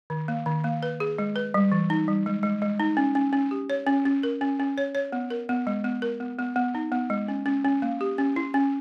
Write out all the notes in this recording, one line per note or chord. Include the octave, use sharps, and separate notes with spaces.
D#3
A#3
D#3
A#3
B4
G#4
G#3
B4
G3
E3
D#4
G3
G#3
G#3
G#3
D#4
C#4
C#4
C#4
G4
C#5
C#4
C#4
A#4
C#4
C#4
C#5
C#5
B3
A#4
B3
G#3
B3
A#4
B3
B3
B3
D#4
B3
G#3
C#4
C#4
C#4
A#3
G4
C#4
E4
C#4